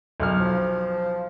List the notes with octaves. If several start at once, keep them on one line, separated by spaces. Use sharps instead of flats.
B1 F6
F3